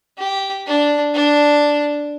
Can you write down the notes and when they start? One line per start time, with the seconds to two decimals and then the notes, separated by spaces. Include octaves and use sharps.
0.18 G4
0.66 D4
1.14 D4